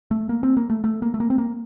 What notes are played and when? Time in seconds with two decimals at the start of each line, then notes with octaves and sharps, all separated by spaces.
0.11 A3
0.29 A#3
0.43 C4
0.57 A#3
0.70 A3
0.84 A3
1.02 A#3
1.14 A3
1.20 A#3
1.30 C4
1.38 A#3